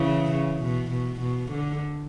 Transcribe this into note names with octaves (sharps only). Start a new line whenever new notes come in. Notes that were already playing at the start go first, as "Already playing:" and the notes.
Already playing: C#3 E3
C#3
B2
B2
B2
D3